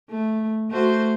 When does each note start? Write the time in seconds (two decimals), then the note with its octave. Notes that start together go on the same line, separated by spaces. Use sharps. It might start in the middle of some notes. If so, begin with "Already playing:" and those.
0.10 A3
0.71 A3 F#4 C5